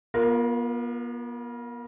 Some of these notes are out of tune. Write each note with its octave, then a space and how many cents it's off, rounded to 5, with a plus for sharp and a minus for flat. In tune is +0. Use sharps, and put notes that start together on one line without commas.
B3 -40 F4 +5 A#4 +0